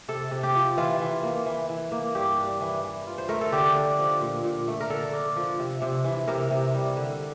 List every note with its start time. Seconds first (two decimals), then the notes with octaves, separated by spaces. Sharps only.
0.08 C3 A4
0.31 C3
0.43 G4
0.55 F3
0.77 E3 F4
1.00 E3
1.23 A#3
1.46 E3
1.69 E3
1.92 A#3
2.15 G2 G4
2.38 D4
2.61 E3
2.84 E3
3.07 F4
3.18 C5
3.29 A3 A#4
3.41 A4
3.52 D3 G4
3.76 D4
3.99 F3
4.21 A#2
4.44 A#2
4.68 A3
4.81 A#4
4.90 D3 A4
5.13 D4
5.36 F3
5.59 C3
5.82 C3
6.04 E3
6.28 C3 A#4
6.51 C3
6.74 G3
6.97 D3